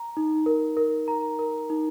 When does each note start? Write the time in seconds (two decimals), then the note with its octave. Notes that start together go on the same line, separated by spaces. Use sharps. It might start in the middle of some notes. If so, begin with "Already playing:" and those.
Already playing: A#5
0.17 D#4
0.46 A#4
0.77 A#4
1.08 A#5
1.39 A#4
1.70 D#4